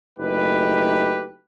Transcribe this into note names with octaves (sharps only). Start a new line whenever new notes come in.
F#1 A3 D#4 G4 B4